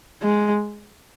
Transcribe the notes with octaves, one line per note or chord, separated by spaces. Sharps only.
G#3